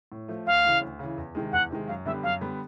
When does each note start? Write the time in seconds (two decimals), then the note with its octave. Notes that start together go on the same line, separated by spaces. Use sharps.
0.12 A2
0.28 F3 A3
0.46 D2 F5
0.65 C#3 E3
0.81 D2
0.99 C#3 E3
1.18 E2
1.35 C3 D#3 G#3
1.52 E2 F#5
1.70 C3 D#3 G#3
1.88 F#2 F5
2.05 D3 G3 B3 E5
2.23 F#2 F5
2.41 D3 G3 B3